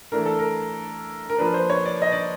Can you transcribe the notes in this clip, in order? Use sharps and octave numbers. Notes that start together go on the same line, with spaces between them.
E3 A3 D4 A#4
A4
A#4
A#4
F3 A#3 D4 B4
C5
C#5
D5
D#5
D5